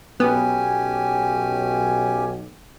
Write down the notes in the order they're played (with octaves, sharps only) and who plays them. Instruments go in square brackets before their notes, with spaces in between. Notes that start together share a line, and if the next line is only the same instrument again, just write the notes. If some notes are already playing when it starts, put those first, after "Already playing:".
[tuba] B1 [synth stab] B3 [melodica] C#4 G4 G#5